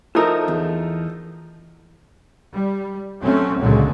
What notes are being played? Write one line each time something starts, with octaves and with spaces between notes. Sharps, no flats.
F3 A3 D#4 A4 A#4
E2
G3
F#3 A3 C4 C#4
C#2 A#2 D3 F#3 G#3